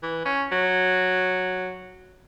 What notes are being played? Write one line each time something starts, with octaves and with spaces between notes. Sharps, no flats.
E3
C#4
F#3